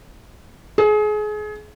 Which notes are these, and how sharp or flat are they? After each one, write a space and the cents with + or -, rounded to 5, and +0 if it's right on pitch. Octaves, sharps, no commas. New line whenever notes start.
G#4 +30